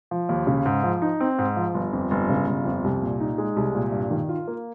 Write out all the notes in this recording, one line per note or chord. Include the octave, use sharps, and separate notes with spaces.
F3
D#2
C#3
G#2
F3
D#4
C4
G#2
F3
G1
F2
G1
C#3
G1
F2
C2
A#2
D#4
G#3
C2
A#2
G2
D#3
F4
A#3